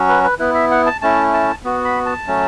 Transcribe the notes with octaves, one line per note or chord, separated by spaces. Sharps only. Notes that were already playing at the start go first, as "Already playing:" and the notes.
Already playing: F#3 C#4 F#4
B4
B4
B3 E4 B4
E5
F#5
A5
A3 C#4 E4 A5
A5
B3 F#4
B5
A5
F#3 A3 C#4